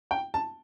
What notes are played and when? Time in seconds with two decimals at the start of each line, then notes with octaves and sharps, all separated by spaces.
0.11 G5
0.34 A5